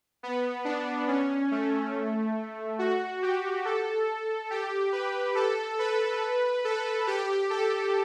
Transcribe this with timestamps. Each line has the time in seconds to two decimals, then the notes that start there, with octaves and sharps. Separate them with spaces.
0.23 B3
0.65 D4
1.08 C#4
1.51 A3
2.79 F#4
3.22 G4
3.65 A4
4.50 G4
4.92 B4
5.35 A4
5.79 B4
6.65 A4
7.07 G4
7.50 A4